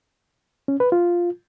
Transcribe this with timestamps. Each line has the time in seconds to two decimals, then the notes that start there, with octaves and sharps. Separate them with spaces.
0.68 C#4
0.80 B4
0.92 F4